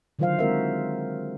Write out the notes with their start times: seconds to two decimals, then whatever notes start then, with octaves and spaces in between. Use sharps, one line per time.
0.19 D3 D#3 F#3 F4 C5 F5
0.39 G#3 C4 F#4 A#4 C5 E5